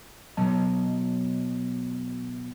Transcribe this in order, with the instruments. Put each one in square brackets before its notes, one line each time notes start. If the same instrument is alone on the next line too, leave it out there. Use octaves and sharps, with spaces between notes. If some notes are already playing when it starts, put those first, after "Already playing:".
[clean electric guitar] B2 F#3 D#5 A5